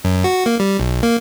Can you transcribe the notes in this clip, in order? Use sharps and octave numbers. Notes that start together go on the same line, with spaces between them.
F#2
F#4
A#3
G3
B1
A#3